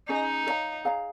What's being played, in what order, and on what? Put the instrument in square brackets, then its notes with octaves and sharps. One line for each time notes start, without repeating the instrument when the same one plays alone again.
[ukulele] C#4 G#4 D#5 [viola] D#4
[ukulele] G#4 C#5 F5 A#5
G#4 C#5 F5 A#5